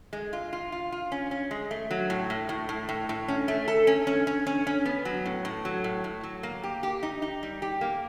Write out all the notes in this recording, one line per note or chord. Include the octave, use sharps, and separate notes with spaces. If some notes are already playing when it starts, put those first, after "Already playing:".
G#3
F4
F4
F4
F4
C#4
C#4
G#3
A3
F#3
A2
A2
A2
A2
A2
A2
C#4
A3
A4
C#4
C#4
C#4
C#4
C#4
B3
F#3
A2
A2
F#3
A2
A2
F#3
A#3
G4
G4
D#4
D#4
G3
G4
A#3